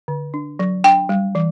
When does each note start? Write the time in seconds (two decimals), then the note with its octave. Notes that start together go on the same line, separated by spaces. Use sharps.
0.08 D3
0.34 D4
0.59 F#3
0.84 D4 G5
1.09 G3
1.35 E3